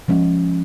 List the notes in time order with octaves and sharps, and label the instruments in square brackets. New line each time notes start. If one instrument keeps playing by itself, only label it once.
[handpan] F3 G#3 C#4